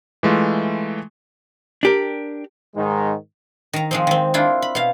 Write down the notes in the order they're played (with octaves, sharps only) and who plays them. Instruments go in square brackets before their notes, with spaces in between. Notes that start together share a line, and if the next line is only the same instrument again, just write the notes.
[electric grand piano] E3 G#3 A3 F4
[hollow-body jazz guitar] D4 G4 A#4
[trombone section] G#2 D#3 G#3 D#4
[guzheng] D#3 A#5
F3 G#3 C4
D#3 C4
D4 E4 F4
B5
B2 F5